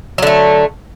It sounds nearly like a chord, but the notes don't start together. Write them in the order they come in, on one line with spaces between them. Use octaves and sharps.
F#3 D3 A3